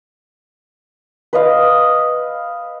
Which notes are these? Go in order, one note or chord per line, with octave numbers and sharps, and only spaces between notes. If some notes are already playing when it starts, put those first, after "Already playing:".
B4 D#5 F5